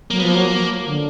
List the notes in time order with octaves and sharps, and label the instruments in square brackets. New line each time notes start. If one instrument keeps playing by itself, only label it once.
[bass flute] F#3 [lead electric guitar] A#3
[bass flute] F3 [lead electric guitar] B3
[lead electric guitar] A#3
[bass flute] F#3
D3